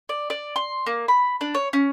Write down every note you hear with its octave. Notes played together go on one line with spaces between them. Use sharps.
D5
D5
C6
A#3
B5
D4
C#5
C#4